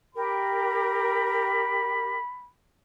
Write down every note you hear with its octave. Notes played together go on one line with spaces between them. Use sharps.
G4 A#4 B5